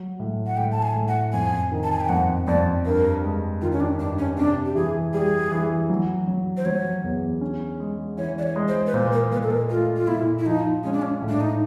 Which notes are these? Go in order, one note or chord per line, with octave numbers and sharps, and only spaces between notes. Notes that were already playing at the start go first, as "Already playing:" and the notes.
Already playing: F#3
A2
F#5
A2 G5
A5
G#5
A2
F#5
F2 G#5
D#3
A5
G#5
G5
F2 F#5
F2 D5
G2 A#4
G#3
D#3 F4
C#4
D4
G2 D4
C#4
C3 D4
G4
E3 G#4
G3 G#4
E3
F#3
F#3
C5
F#3 C#5
E2
C#4
G#3
E3 C#5
D5
C#5
G#3
C5
B4
A#2 C5
A#4
A#2 B4
A4
A#4
A3 F4
F4
A#2 E4
E4
F3 D#4
G#3 C#4
D4
C#4
A2
D4
D#4